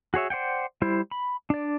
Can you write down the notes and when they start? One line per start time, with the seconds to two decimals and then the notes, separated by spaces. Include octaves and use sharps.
0.14 F#4 G#4 C#5 E5
0.30 C5 D5 F#5 G5
0.82 G3 E4 C5
1.11 B5
1.50 D4 D5